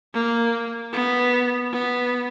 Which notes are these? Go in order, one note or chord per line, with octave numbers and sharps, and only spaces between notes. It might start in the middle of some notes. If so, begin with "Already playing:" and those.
A#3
B3
B3